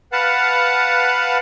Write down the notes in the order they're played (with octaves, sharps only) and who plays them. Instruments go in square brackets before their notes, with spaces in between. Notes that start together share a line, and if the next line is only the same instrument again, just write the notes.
[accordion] B4 F5 F#5 A5